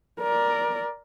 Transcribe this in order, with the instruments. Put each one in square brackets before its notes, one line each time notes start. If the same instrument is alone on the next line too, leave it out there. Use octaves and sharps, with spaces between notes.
[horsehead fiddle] A#4 D5